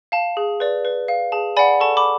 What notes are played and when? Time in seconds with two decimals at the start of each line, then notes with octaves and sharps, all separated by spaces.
0.12 F5 A5
0.37 G#4
0.60 B4 D5
0.85 B4
1.08 F5
1.32 G#4 A5
1.57 D5 F#5 G#5 B5
1.80 A4 A5 C#6
1.97 B5 D6